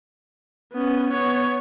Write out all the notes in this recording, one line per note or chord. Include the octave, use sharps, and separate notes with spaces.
B3 C#4
B3 C#5